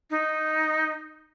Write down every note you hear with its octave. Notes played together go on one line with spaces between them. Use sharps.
D#4